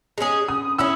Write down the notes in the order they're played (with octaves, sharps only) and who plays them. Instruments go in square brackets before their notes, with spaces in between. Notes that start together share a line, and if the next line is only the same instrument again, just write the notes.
[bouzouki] G#3 C#4 G#4
[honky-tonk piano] D#6
[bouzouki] C#4 E4 [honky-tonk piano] E6